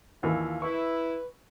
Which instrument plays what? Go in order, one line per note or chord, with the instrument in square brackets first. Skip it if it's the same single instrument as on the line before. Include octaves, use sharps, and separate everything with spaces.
[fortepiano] D#2 E3 [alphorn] F4
[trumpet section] E4 [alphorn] B4 [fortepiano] C#6